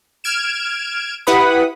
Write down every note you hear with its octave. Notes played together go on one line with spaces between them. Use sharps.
F6 G#6 D7 E7
E4 G4 B4 F#5 B5 D#6